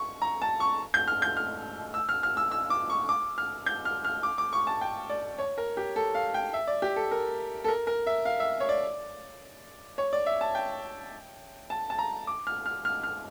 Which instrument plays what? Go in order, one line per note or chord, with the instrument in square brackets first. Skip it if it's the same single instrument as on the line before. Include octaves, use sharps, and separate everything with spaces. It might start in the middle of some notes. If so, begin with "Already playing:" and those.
Already playing: [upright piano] C#6
A#5
A5
C#6
G6
F6
G6
F6
E6
F6
F6
E6
E6
D6
C#6
D6
F6
G6
F6
F6
D6
D6
C#6
A5
G5
D5
C#5
A#4
G4
A4
F5
G5
E5
D5
G4
A4
A#4
A4
A#4
A#4
E5
F5
E5
C#5
D5
C#5
D5
E5
A5
G5
A5
A5
A#5
D6
F6
F6
F6
F6